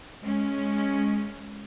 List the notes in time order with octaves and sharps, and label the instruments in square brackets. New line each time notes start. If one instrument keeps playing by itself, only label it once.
[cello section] G#3 C#4